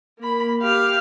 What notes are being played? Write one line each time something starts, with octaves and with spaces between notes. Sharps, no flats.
A#3 B5
G4 F5